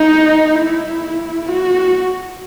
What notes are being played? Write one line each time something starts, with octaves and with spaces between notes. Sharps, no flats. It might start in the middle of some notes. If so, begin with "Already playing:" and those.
Already playing: D#4
E4
F#4